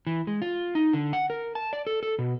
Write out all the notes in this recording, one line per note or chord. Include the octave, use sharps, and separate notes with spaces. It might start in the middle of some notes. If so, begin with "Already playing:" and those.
E3
G#3
F4
D#4
D3
F#5
A#4
A5
D5
A4
A4
B2